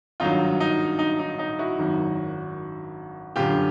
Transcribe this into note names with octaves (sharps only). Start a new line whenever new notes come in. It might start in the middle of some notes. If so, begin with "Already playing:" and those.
G#1 G2 D#3 F#3 D#4 F4
D#4
D#4
D#4
D#4
E4 F#4
G#1 F#2 D#3 F#3
G1 F#2 D3 F4 G4